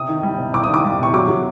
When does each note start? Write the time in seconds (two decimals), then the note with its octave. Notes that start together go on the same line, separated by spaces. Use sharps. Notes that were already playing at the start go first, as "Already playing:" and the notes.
Already playing: C3 D#6
0.09 D#3
0.23 G3
0.38 C3
0.53 C3 D6
0.64 D#6
0.69 D#3 D6
0.84 G3
0.99 C3 C#6
1.13 F#3 D6
1.28 F#3